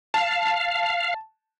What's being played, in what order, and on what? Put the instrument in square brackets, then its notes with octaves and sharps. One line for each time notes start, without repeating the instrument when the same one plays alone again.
[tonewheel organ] F5 [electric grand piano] A5